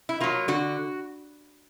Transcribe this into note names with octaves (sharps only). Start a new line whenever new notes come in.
E4
F#3 A#3 F4
D3 F#4